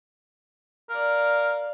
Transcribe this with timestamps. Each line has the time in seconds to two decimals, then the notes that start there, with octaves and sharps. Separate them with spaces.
0.90 A#4 D5 F5